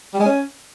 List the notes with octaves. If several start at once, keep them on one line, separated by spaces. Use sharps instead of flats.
G3
G#3
C#4